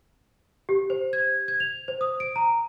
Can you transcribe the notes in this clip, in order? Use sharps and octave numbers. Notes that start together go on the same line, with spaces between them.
G4
C5
G#6
G#6
F7
C5
D#6
D7
A#5